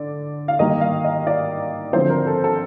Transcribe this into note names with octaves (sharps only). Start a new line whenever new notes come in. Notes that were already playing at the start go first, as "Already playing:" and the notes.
Already playing: D3 D5
F5
D#3 G3 A#3 D#5
F5
D#5
D5
D3 F3 C4 C5
A#4
A4
A4